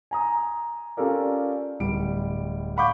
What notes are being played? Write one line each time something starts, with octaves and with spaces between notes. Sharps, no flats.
G#5 A#5 D#6
C#4 F4 G4 A4 A#4 D5
D1 G3 D7
F5 F#5 B5 C#6 D6 G6